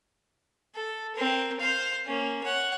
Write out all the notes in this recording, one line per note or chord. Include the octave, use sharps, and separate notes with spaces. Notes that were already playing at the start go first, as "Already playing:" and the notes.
A4
C4 A#4
C5 F5
A#3 C#4
C#5 F#5